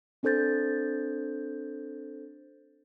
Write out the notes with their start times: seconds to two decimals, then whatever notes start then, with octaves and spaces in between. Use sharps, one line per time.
0.23 C4 D4 A4 C5 G6 A6